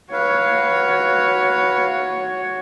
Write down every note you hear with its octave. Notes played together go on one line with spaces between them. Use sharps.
F#4 B4 C#5 F5